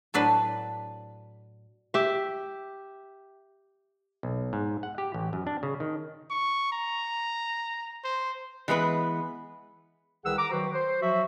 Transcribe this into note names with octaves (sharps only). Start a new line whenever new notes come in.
A2 F#3 D4 B4 C5
G4 E5
B1
G#2
F#5
G4
A1
F#2
D4
C#3
D#3
C#6
A#5
C5
E3 G#3 B3 B4
C2 D#3 G#4 B4 F#5 E6
A#5 D6
D#3 F#3 F#4 B4 C5
C5
F3 F#3 F#4 E5